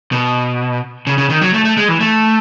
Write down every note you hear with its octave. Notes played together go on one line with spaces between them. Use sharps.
B2
C#3
C#3
D#3
F#3
A3
A3
G#3
E3
A3